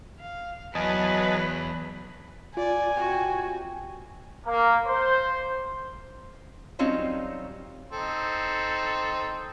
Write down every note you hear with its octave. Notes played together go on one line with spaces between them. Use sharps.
F5
E2 F#3 B4 D#5 G#5 A5
F4 D5 G#5
C3 F#4 G5
A#3
C5
F#3 G3 C4 C#4 D#4 F4
C4 D#4 A4